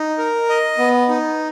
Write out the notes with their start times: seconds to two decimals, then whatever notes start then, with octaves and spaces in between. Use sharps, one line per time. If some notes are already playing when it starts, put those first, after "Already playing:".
Already playing: D#4
0.18 A#4
0.49 D#5
0.78 B3
1.09 D#4